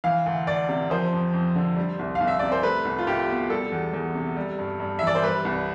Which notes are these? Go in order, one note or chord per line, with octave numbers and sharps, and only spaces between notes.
E3 F5
D2
D2 D5
C3
F3 C5
F2
F2
D3
G3
C2
F5
C2
E5
C3 D5
C5
A3 B4
C2
F4
C2 G4
B2
G3 A4
E2
E2
C3
G3
G2
G2
E3 E5
D5
C5
G3 B4
C2